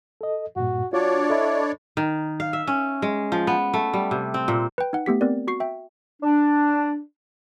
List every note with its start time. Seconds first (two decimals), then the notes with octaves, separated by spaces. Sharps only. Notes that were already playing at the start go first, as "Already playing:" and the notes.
0.21 A4 D#5
0.56 G2 A#2 F#4
0.93 F#3 D4 F4 C#5 D5
1.30 E4 A4 D#5 B5
1.97 D#3
2.40 F5
2.53 E5
2.67 C#4
3.02 G#3
3.32 F3
3.47 B3
3.74 A3
3.94 G3
4.11 C3
4.34 C4
4.48 A#2
4.78 B4 G5
4.93 D#4 F#5
5.06 A3 B3 G4 B6
5.21 B3 C4 A#4 D5
5.47 F#4 C#6 C7
5.60 E5 G5
6.22 D4